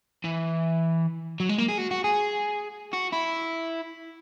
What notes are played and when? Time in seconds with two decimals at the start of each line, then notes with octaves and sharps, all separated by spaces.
0.24 E3
1.40 F#3
1.49 G#3
1.58 A#3
1.68 G#4
1.78 F#4
1.91 F#4
2.04 G#4
2.93 F#4
3.13 E4